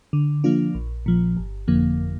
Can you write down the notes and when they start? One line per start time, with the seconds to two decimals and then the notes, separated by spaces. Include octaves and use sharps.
0.13 D3
0.44 F3 A#3 D4 F4
0.75 A#1
1.06 A#2 F3
1.37 G1
1.68 F2 D3 F3 A#3